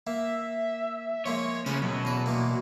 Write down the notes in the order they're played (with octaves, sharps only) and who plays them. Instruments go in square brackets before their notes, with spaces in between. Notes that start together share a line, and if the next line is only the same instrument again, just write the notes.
[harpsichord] A#3 [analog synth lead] E5
[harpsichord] F3 G#3 A#3 [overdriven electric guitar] C#5
[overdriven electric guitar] A2 C#4 [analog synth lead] C#3 [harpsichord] C5 B5
[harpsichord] F#2 [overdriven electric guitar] B2 [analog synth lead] F#3
[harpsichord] E2 B4
A#2 E3 A#3